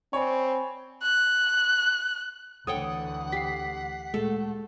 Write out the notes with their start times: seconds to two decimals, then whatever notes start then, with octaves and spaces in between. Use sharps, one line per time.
0.13 C4 C#5 D5 G#5 B5
1.03 F#6
2.67 D2 D3 E3 A4 C#5 F#5 G5 D#6
3.32 G4 B6 C7
4.14 A#2 G#3 A3 A4